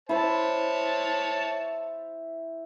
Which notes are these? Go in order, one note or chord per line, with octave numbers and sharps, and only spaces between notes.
E4 C5 C#5 A5